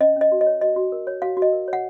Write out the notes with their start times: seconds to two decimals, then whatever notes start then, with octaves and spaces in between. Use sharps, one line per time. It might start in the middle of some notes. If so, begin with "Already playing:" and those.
0.01 C#4 D#5
0.16 C#4 D#5
0.32 F#4
0.41 D#5
0.47 C#5
0.61 F#4 D#5
0.76 F#4
0.92 A#4
1.07 C#5
1.22 F#4 F5
1.37 F#4
1.42 D#5
1.53 A#4
1.68 C#5
1.73 F#5